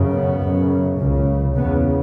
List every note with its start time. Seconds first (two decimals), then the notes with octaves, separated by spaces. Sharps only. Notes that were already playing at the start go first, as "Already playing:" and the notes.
Already playing: F#2 C#3
0.11 B3
0.40 F#2 C#3
0.98 C#2 C#3
1.55 E2 C#3 B3